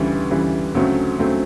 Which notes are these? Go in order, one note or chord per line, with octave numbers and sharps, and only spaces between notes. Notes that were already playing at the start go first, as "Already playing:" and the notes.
Already playing: D2 C#3 E3 G3
D2 C#3 E3 G3
D2 C#3 F#3 A3 C4
D2 C#3 F#3 A3 C4